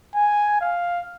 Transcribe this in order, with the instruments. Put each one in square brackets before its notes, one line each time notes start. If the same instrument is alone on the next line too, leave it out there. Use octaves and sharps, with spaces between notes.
[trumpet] G#5
F5